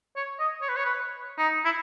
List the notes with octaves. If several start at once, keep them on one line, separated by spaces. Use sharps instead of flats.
C#5
D#5
C#5
B4
C#5
B4
D#4
E4